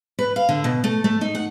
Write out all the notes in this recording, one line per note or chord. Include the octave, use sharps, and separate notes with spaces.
B4
F5
D3
B2
A3
A3
D#4
F#5